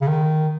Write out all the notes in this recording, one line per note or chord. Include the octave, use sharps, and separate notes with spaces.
C#3
D#3